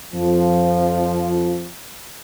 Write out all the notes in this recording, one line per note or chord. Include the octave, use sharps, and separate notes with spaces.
F2 F3